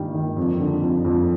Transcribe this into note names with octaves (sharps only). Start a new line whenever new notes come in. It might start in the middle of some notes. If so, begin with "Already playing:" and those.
Already playing: G2 D#3 G3
D#3
F2
D3
F2
F2